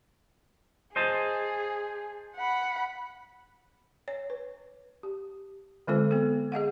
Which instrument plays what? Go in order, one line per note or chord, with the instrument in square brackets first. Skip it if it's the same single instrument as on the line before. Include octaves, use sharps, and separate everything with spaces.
[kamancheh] G#4 [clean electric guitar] C5 D#5 A5
[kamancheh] F#5 B5
[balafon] C#5
B4
G4
D3 G#3 C4 F4 A4 C5
B3 A4
G#4 D#5 F5 F#5